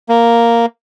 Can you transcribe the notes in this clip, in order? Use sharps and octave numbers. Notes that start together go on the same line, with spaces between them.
A#3